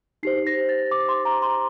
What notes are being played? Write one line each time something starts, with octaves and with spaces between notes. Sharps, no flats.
D#4 G4 C5 C7
A#6
A6
D6
C6
A#5
C6